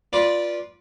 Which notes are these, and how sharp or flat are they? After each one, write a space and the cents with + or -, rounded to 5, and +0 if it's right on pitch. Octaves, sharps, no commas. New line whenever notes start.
F4 +0 B4 -25 D5 +0